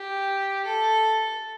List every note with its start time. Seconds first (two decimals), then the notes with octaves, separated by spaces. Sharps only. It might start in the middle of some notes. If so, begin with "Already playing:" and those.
Already playing: G4
0.65 A4